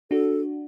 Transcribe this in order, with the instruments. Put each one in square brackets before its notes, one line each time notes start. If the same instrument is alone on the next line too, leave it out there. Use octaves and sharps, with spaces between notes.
[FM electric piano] D4 F#4 [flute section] A4